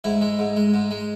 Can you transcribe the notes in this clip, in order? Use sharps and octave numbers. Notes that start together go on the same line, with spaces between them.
G#2 E4
G#3
G#2
G#3
G#2
G#3